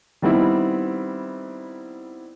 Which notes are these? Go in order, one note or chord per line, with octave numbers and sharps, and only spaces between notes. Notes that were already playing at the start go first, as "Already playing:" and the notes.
D#3 G3 B3 C4 E4